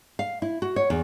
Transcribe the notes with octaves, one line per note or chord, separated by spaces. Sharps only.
F5
E4
F#4
C#5
E2